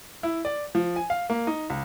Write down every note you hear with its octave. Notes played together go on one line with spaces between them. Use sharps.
E4
D5
F3
G#5
F5
A#3
D#4
C#2